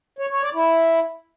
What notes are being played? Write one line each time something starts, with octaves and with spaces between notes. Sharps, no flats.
C#5
C#5
D5
E4